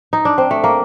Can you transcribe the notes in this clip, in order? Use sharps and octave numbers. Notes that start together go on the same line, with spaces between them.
D#4
D4
C4
A3
A#3